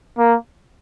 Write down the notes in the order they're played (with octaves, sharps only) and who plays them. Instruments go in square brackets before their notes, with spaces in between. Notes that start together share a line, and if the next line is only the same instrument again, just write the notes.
[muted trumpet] A#3